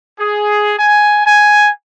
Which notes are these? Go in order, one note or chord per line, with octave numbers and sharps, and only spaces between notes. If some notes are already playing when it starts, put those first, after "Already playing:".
G#4
G#5
G#5